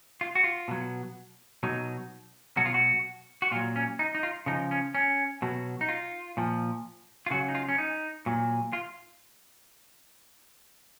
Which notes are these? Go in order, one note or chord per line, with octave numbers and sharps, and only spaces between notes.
F4
F#4
F4
B2 F#3
B2 F#3 D#4
B2 F#3 F#4
F4
F#4
F#4
A#2 F#3 F4
C#4
D#4
D#4
F4
C#3 F3 D#4
C#4
C#4
B2 F#3
D#4
F4
A#2 F3
F4
C#3 F#3 F#4
D#4
F4
C#4
D#4
A#2 F#3
F4